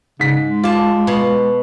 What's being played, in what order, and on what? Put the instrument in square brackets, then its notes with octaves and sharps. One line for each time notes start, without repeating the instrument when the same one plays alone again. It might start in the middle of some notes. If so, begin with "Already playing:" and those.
[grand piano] G#2 B6 [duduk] C#3
[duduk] G#3
[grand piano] F4 [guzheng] D5 A5
[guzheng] B2